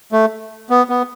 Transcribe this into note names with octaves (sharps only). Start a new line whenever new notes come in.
A3
B3
B3